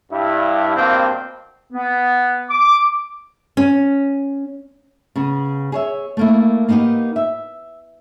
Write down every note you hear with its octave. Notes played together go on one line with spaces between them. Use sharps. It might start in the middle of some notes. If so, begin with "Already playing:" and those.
G2 E4
G2 B2 A#3 C4
B3
D6
C#4
C#3 B3
G#4 C#5 E5
A3 A#3 E4
A#3 B3 D#4 F4 G4
E5